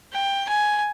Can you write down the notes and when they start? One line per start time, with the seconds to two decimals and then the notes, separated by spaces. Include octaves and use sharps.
0.13 G5
0.49 G#5